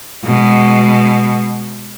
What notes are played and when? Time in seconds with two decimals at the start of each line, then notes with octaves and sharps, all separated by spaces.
0.24 B2 G#3